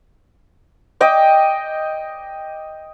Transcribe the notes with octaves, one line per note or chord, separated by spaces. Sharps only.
D#5 G5 D6